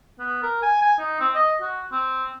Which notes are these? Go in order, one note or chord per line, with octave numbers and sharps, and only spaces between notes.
B3
A#4
G#5
G#5
D#4
C4
D#5
F#4
C4